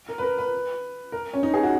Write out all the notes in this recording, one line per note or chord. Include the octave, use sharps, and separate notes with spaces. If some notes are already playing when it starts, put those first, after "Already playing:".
A#4
B4
A#4
B4
A#4
C#4
D#4
G#4
F#4